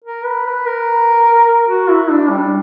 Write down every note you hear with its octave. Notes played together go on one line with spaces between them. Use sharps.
A#4
B4
B4
A#4
F#4
E4
D4
G3